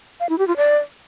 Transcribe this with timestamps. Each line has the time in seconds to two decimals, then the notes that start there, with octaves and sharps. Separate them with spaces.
0.20 F5
0.29 E4
0.38 G4
0.48 F4
0.57 D5